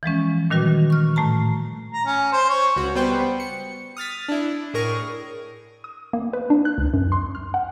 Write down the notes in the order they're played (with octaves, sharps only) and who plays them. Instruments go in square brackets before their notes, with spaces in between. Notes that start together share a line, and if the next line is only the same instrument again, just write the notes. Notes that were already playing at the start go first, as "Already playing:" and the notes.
[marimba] E3 F3 G#3 C#4
A#2 D#3 G3 F#4 B4
C#6 F6
A2 A3 A5 A#5
[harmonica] A#5
C#4
C5
C#5
[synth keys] C#2 F#4
G3 B3 B4 C5 G5
C#7
D#6 F6 A6 B6
D4 E4
A2 G#4 A#4 C#6 A#6 D#7
[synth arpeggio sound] D#6
A#3
B4
D4
F#6
C#2
F#2
C6
F6
F#5